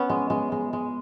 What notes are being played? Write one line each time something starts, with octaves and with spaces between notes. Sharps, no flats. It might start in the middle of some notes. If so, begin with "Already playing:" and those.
Already playing: B3 C#4
G#3
G#3
G#3
G#3